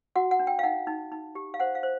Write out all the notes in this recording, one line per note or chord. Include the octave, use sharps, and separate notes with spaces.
F#4 F#5
F#5
D4
G5
F5
D#4 F#5
D#4
D#4
G4
F5
C5 F#5
F5
C5